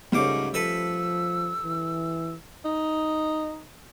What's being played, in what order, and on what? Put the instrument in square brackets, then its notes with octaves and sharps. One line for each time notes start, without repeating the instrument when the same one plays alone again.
[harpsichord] C#2 G#2 D6 [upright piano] G3 A3 C#4
[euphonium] F3 [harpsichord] A4 B4 E5 [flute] E6
[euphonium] E3
[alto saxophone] D#4